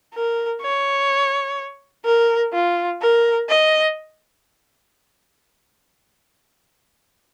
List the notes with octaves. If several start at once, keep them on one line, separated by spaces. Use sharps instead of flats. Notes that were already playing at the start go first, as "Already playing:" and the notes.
A#4
C#5
A#4
F4
A#4
D#5